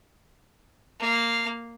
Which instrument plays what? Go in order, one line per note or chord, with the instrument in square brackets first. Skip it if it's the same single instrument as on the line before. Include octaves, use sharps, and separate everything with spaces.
[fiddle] A#3 F5